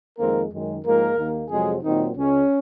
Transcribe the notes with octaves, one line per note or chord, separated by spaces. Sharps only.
F2 D#3 G#3 A#3 C4 A#4
F#2 D#3 G#3
G#2 F3 G#3 A#3 A#4
D#2 D#3 A#3
F2 C3 F#3 G#3 C4 G#4
A#2 D#3 F#3 C4 D#4
C#2 C#3 G#3 C#4